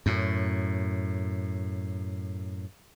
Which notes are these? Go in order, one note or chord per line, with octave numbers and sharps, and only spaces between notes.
F#2 A2